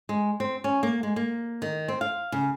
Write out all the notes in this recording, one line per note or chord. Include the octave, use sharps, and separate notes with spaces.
G#3
C4
C#4
A#3
G#3
A#3
D#3
C4
F5
C#3